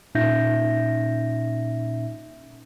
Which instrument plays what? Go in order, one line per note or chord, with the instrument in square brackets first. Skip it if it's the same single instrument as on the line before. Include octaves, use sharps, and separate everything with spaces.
[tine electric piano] A#2 C#4 D#4 E5 G6 A#6